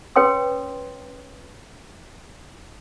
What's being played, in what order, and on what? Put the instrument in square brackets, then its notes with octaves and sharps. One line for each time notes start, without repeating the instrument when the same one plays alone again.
[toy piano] C#4 B4 C#5 G5 C6 D#6